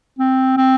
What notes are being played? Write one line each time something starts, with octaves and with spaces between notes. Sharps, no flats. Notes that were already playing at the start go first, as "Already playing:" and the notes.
C4
C4